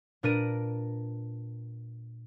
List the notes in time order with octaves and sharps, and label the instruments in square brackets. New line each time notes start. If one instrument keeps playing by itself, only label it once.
[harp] A#2 D4 A#4 B4 D7 D#7